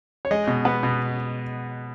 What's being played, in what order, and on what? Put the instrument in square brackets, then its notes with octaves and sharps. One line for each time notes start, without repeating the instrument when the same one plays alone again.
[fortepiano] C#5
G#3 D#5
B2
B3
B2